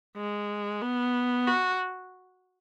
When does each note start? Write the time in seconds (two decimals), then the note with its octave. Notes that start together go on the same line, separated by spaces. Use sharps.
0.16 G#3
0.82 B3
1.47 F#4